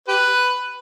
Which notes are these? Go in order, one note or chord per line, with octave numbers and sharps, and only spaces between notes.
G4 B4